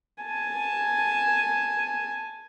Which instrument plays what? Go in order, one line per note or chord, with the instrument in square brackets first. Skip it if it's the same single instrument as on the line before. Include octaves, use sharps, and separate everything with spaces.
[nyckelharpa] G#5 A5